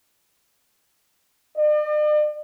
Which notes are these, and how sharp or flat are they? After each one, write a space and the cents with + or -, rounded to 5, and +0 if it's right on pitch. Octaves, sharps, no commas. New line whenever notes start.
D5 +45